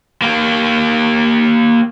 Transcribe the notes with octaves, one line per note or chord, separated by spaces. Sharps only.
A#3 G4